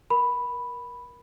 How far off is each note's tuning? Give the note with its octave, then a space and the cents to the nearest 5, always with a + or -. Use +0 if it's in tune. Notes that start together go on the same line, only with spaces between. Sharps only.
A#4 +15 B5 +0